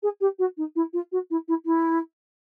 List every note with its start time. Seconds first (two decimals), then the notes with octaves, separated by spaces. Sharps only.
0.03 G#4
0.21 G4
0.39 F#4
0.57 D#4
0.76 E4
0.93 F4
1.12 F#4
1.30 E4
1.48 E4
1.65 E4